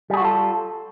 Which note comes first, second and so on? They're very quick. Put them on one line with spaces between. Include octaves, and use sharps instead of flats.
G3 G#4 F#4 F4 A4